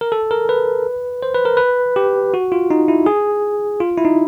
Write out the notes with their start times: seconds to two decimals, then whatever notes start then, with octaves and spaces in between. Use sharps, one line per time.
0.01 A#4
0.12 A4
0.31 A#4
0.49 B4
1.23 C5
1.35 B4
1.45 A#4
1.57 B4
1.96 G4
2.34 F#4
2.52 F4
2.71 D#4
2.88 E4
3.06 G#4
3.80 F4
3.98 E4
4.05 D#4